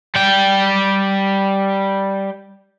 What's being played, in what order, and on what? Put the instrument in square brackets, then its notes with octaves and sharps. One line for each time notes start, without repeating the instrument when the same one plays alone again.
[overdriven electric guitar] G3 G5